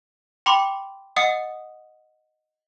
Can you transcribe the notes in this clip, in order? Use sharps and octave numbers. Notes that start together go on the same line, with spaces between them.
G5 B5 C6 D6
D#5 F#5 D#6 C#7